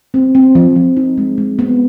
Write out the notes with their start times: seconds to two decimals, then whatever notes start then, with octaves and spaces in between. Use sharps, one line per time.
0.14 C4
0.35 C4
0.55 F3
0.76 F3
0.97 D#4
1.18 G#3
1.38 G#3
1.59 B3